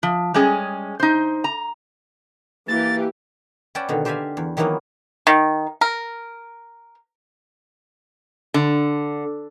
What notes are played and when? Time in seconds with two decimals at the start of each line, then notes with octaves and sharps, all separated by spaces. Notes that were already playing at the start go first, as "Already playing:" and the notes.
0.03 F3
0.34 G3 G#3 C#4 G#4
1.00 D#4 C5
1.44 A#5
2.68 E3 A#3 G4 A6
3.75 C#4 B4 D5 F#5 G5 A5
3.89 B2 D3 D#3
4.05 G4 C5 D5 E5 F5 G#5
4.37 E2
4.57 D#3 E3 F#3 A#3 B3 C#4
5.27 D#3
5.81 A#4
8.54 D3